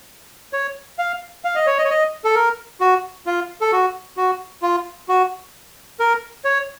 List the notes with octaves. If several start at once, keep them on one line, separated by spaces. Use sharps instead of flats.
C#5
F5
F5
D#5
C#5
D#5
C#5
D#5
A4
A#4
F#4
F4
A4
F#4
F#4
F4
F#4
A#4
C#5